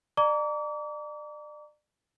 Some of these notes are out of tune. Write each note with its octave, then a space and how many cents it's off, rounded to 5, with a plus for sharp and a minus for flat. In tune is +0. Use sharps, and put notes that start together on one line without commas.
D5 +35 A#5 -20 D6 -40